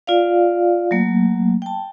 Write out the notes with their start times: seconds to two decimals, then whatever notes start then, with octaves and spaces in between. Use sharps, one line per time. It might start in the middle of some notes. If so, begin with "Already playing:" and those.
0.07 F4 D5 F5
0.91 F#3 A3 A#3
1.62 G5 A5